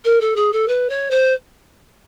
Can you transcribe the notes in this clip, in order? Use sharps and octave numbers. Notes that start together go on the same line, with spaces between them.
A#4
A4
G#4
A4
B4
C#5
C5